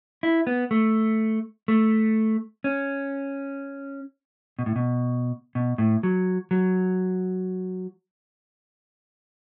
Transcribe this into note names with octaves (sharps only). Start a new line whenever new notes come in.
E4
B3
A3
A3
C#4
B2
A2
B2
B2
A2
F#3
F#3